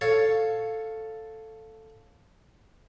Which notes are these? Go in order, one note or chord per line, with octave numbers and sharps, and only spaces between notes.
A4 C#5 F5 A5